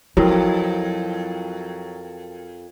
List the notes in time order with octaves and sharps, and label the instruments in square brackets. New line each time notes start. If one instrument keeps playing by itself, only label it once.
[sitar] F2 [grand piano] F#3 [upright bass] E4 [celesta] F#4 A#4 G5